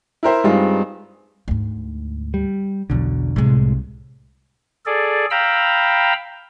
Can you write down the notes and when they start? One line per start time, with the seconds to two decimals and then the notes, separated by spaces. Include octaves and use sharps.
0.23 E4 A#4 C5 E5
0.44 G2 G3 G#3 C4 D#4 F4
1.48 D2 G#2
2.34 G3
2.90 B1 E2 B2 D3 F#3
3.36 C2 A2 C3 G#3
4.86 G#4 A4 D5
5.31 F5 G5 A#5 B5 E6